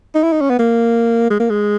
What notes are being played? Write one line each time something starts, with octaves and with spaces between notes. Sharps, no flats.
D#4
E4
D#4
C#4
B3
A#3
G#3
A#3
G#3